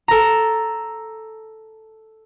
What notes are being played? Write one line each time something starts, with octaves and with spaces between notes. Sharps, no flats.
A4 A#5